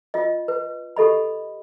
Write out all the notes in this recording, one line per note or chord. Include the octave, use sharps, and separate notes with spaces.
F4 D#5
B4
G4 A4 D#5 B5